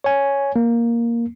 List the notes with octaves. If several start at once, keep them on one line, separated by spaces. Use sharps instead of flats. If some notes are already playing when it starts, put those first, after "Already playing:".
C#5 G#5
A#3